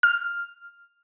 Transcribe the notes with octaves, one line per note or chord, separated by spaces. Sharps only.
F6